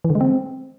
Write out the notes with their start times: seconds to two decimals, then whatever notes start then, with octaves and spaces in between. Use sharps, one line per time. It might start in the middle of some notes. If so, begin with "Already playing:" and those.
0.05 E3
0.10 D3
0.15 G#3
0.21 C4